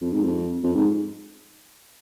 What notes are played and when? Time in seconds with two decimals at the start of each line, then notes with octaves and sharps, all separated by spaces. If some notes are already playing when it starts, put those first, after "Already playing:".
0.01 F2
0.13 G#2
0.24 F2
0.64 F2
0.75 G#2